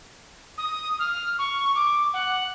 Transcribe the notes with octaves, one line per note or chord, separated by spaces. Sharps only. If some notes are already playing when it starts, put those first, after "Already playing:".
D#6
F6
C#6
D6
F#5